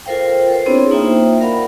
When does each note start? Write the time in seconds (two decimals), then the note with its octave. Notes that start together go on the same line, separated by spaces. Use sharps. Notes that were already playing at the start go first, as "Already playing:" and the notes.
0.06 F4 A4 A#4 C5 F5 G5
0.49 A4 B4 C5
0.66 B3 C4 D4 E4 G#4 C#5
0.91 A#3 D#4 F4 C5 E5 G5
1.41 A#4 D5 F5 F#5 B5